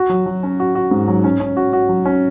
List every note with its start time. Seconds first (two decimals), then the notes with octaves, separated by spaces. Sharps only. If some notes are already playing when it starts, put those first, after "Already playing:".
Already playing: F#4
0.09 F#3
0.26 F#3
0.43 C#4
0.60 F#4
0.75 F#4
0.91 G#2
1.08 F#3
1.24 C#4
1.40 C#4
1.57 F#4
1.73 F#4
1.89 F#3
2.05 C#4